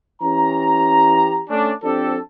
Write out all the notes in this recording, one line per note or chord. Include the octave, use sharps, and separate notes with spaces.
E3 C#4 G4 A#5
A3 C#4 D4
F3 C4 D4 G4 A4